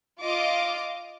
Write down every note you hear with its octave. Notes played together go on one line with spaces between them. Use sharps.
F4 D#5 F5 D6